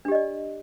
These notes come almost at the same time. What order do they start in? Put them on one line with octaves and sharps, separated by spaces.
D4 G4 D#5 D5